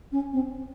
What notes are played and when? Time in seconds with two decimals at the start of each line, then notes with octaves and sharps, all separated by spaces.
0.12 C#4
0.33 C4